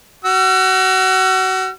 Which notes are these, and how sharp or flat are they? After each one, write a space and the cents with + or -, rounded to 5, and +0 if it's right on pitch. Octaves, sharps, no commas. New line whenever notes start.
F#4 +25 E6 +45